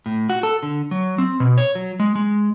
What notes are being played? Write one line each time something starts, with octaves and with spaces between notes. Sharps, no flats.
A2
F#4
A4
D3
F#3
C4
B2
C#5
F#3
G#3
G#3